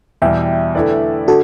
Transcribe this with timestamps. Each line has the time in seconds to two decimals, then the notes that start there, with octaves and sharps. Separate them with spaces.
0.22 E2 B2 G3 E5 G5
0.75 D3 A3 E4 B4 D5
1.28 D3 F#4 A4